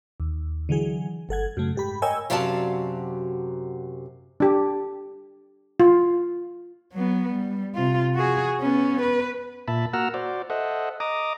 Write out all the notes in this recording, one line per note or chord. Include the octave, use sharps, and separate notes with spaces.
D#2
D3 E3 F#3 G#4
G1 A4 F#5 G#6
F#2 C#3 A3
G#2 G4 B5
A#4 C#5 D#5 G5 G#5 E6
F#2 C3 F#3 D5 F5 A5
D4 G4
F4
F#3 B3
G3
C3 F4
F#4 G#4
B3 C#4
B4
A#2 E5 A5 B5
A#3 F#4 F#5 A#5 E6 F6
F#4 C5 D5
A4 C5 D#5 E5 F#5
D#5 A#5 D6 D#6